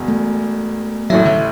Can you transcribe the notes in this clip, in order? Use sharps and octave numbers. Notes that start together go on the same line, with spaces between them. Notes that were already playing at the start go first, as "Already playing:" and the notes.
Already playing: E1 E2
A3
A1 A2 F#3 A3 E4
D3